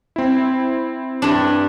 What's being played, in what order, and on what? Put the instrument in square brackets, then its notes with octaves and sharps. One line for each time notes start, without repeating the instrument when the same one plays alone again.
[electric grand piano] C4 E4
[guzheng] G2 D4